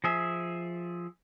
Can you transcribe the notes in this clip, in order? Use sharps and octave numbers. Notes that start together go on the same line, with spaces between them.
F3 G#4 E5